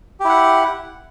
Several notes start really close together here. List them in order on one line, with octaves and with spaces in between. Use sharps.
G4 E4 F#5